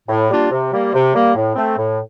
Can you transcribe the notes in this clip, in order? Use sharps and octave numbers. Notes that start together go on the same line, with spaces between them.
A2
G3 A#3 D4 F4
C3
G3 A#3
C3
G3 A#3
A2
A3 C4
A2